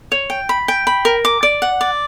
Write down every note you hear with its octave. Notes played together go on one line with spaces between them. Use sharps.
C#5
G5
B5
G5
B5
A#4
D6
D5
F#5
D5